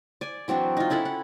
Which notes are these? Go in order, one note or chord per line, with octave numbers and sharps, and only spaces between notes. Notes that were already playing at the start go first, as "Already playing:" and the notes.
D5 G#5
E3 F#3 C4 D4
D#4 F4
C#4 E4 A4 F#5
F#5